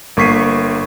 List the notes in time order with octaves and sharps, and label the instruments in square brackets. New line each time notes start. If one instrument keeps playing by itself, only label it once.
[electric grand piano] G1 A#3 C#6 B6 C7 D#7